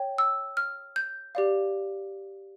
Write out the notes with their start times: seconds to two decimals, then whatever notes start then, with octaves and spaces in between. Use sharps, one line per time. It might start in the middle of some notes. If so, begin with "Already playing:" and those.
Already playing: C#5 G5
0.18 E6
0.57 F6
0.96 G6
1.35 G4 D5 F5